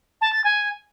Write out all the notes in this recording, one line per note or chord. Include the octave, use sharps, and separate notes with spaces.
A5
A6
G#5